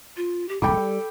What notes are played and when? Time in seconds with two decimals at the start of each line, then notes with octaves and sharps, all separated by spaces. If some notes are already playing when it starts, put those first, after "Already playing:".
0.17 F4
0.49 G4
0.62 D#1 C2 G#2 A4 G5 B5 D6
0.74 F#3 G3